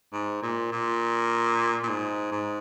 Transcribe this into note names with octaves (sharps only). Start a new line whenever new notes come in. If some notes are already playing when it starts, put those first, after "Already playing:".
G#2
A#2
A#2
A#2
G#2
G#2